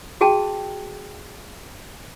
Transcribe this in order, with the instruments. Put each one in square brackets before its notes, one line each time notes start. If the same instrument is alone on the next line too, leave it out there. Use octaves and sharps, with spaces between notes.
[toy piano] F#4 G#4 G5 A5